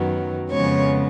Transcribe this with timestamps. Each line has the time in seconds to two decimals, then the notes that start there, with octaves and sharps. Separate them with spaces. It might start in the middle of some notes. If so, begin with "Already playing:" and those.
Already playing: F#2 D#3 F#3 B3
0.51 F2 C#3 F3 G#3 B3 C#5